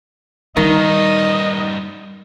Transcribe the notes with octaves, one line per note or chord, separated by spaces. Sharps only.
G2 D#3 G3 D#4 D#5